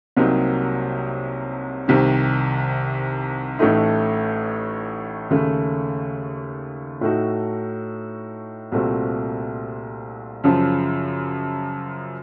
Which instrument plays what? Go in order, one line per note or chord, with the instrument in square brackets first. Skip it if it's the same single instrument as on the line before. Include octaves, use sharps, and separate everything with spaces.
[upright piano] C2 C3 F#3 A#3 D#4
C2 C3 D#3
A1 A2 A3 D#4
D#2 C#3 A3
A2 A3 D#4 F#4
C2 A#2 A3 C4 F#4
F#2 C#3 F3